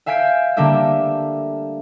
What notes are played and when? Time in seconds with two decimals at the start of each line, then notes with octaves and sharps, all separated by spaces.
0.06 E5 F5 G#5 G6 B6 D7
0.57 D3 G3 A3 A#3 D4 E5